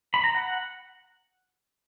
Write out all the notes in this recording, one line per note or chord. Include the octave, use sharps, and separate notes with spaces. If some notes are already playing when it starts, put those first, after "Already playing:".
B5
A#5
F#5